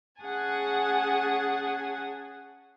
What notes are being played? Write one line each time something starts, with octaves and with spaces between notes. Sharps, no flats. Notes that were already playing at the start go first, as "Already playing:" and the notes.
C#4 G#4 F#5 G#5 A5